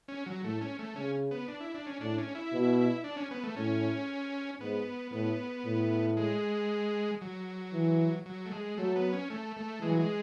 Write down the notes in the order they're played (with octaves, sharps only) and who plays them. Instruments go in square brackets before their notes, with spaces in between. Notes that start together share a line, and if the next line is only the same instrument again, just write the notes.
[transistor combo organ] C#4
F#3
[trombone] A2 [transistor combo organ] A3
[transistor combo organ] C#4
A3
[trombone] C#3 [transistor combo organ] C#4
[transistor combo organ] B3
D4
E4
D4
C#4
[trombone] A2 [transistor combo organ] D4
[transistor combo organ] C#4
E4
[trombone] B2
[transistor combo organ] D4
C#4
B3
A3
[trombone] A2 [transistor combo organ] C#4
[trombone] G#2 [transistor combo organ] B3
[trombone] A2 [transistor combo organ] B3
[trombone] A2
[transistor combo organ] G#3
F#3
[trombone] E3
[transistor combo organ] F#3
A3
G#3
[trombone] F#3 [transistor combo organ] A3
[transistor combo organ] B3
C#4
A3
A3
[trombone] E3 [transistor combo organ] G#3
[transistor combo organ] F#3
G#3